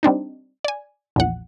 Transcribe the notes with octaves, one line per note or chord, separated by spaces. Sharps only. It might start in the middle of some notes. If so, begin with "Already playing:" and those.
G3 C4 D4 D#4
D5 G#5
A#1 E2 F#5